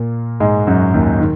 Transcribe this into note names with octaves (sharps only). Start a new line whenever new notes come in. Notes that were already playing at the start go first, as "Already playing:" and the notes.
Already playing: A#2 A#3
G#2 G#3
F#2 F#3
D#2 D#3
D#3